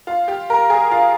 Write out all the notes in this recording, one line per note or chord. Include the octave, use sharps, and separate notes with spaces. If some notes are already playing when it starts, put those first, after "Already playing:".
F4
G4
A#4
G#4
F4